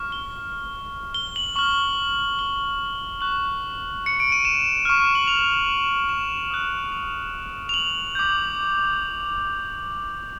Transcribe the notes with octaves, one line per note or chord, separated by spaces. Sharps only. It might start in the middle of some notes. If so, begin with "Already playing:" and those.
Already playing: C#6 F6
G7
G7
F#7
C#6 F6 F#7
G7
C#6 F#6 F#7
C#7
D7
D#7
E7
C#6 F6
F#7
F7
E7
D#6 F#6
F7
F7
F#7
D6 G6